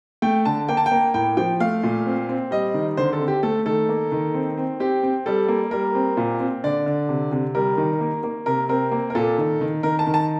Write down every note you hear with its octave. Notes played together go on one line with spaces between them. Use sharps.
A3 G5
D3 A5
A#3 G5
A5
G5
A#3
A2 G5
F3 G5
A3 F5
A#2
C4
C4
G3 D#5
D#3
D3 C5
A4
C4
G4
A3 A4
D#3 A4
A#3
D#3
C4
C4
C4 G4
C4
G3 A4
A#3
G3 A#4
C4
A#2
C4
D3 D5
D3
C3
C3
G3 A#4
D#3
A#3
A#3
C3 A#4
C4 A#4
A#3
A#4
A#2 A4
D#3
D#3
D#3 A#4
A5
D#3
A5